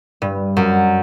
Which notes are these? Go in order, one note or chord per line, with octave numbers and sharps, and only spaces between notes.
G2
F#2